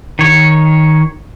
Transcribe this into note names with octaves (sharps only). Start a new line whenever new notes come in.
D#3 C#5